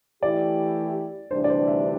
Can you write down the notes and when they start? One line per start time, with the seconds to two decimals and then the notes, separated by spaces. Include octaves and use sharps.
0.23 E3 A3 E4 G4 D5
1.31 D2 C3 E3 G3 D4 C5
1.44 D5
1.50 C5
1.67 E5